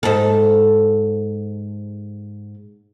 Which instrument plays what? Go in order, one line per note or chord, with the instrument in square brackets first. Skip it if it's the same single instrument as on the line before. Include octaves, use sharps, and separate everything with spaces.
[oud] G#2 A4